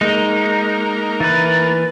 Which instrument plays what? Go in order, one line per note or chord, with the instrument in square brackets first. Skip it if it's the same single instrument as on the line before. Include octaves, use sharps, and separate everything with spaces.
[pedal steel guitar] G#3 [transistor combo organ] A#3 [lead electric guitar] D#4
[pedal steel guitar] E3 B4 [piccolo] A6